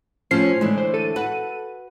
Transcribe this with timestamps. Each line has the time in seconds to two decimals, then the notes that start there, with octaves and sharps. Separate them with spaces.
0.31 A2 F3 C#4 F4 C5 C7
0.61 A2 D3 E3 G#3
0.78 C5
0.94 A4 D#7
1.16 F#4 B4 F#5